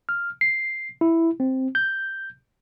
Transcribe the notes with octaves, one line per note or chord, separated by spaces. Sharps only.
F6
C7
E4
C4
G6